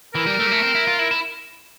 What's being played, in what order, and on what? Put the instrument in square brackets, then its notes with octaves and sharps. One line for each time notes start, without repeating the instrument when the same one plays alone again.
[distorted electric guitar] E3 [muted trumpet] A#4
[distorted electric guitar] G3
A3
G3
A3
C4
E4
F4
E4
E4